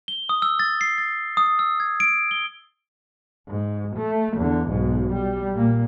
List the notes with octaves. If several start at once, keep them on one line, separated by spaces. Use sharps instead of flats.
G7
D#6
E6
A6
C7
A6
D#6
E6
G#6
D7
G7
G#2
A3
E2 D3
B1 G#2
G3
A#2 A#3